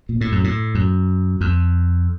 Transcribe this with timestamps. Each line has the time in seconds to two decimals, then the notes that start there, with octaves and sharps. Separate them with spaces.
0.09 A#2
0.21 A2
0.32 F#2
0.44 A2
0.75 F#2
1.41 F2